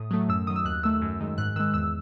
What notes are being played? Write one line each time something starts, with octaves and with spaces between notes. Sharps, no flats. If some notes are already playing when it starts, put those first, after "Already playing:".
Already playing: A2 D#6
F#3 A3
F#2 E6
D#3 F#3 D#6
E6
D#2 F#6
D#3 A3 E6
F#2
D#3 G#3
G#2 F#6
D#3 G#3 E6
E2 E6